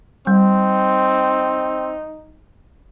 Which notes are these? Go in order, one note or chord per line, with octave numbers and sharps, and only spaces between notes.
G3 C4 D#4